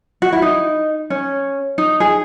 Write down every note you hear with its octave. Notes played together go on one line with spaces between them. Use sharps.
F#4
E4
D#4
C#4
D#4
G#4